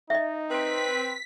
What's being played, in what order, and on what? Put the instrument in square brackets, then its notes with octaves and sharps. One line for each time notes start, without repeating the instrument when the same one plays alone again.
[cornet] D#4 [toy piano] D#5 E5
[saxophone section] C4 B4 [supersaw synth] B6